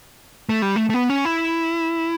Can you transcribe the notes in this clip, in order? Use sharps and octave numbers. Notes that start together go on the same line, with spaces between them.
A3
G3
A3
A3
B3
C#4
E4